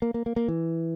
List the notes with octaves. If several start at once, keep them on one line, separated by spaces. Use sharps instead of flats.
A#3
A#3
A#3
A#3
E3